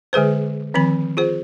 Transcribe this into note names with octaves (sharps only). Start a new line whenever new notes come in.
D3 G#3 G#4 B4 C5
D#3 F3 C4 B5
F4 G#4 C5